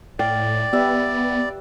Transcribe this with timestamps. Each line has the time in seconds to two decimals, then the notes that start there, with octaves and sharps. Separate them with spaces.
0.19 A2 D5 F5 G5
0.73 G3 B3 B4 E5